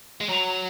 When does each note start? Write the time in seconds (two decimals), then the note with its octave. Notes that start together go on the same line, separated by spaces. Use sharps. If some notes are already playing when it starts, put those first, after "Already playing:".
0.21 G#3
0.29 F#3 A#5
0.46 A#5